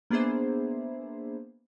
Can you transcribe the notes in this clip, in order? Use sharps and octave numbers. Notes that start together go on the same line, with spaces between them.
A#3 B3 D4 G#4 C5 E5